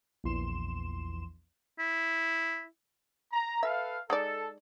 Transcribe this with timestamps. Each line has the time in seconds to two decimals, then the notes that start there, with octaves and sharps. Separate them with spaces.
0.24 A#1 E2 C6 E7
1.79 E4
3.32 A#5
3.63 A4 B4 E5 F5
4.10 G#3 D#4 A4 D5